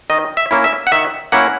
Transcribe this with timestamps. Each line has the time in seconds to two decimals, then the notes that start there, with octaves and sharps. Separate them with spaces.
0.10 D#3 D#5
0.37 E5
0.51 A#3 C#4 E4
0.64 E5
0.87 F#5
0.92 D#3 E5
1.32 A#3 C#4 E4 F#5